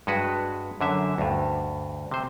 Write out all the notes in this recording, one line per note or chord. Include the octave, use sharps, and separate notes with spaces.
G2 G#3 F#4 B4
F#2 D3 E5
D2 G2
C3 C5